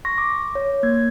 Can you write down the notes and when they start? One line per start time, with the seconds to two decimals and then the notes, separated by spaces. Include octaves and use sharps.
0.05 C6 C#6 A#6
0.18 D6
0.55 C#5
0.83 A#3 G#6